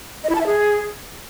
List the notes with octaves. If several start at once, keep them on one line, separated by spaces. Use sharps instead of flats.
D#5
E4
A5
E5
G#4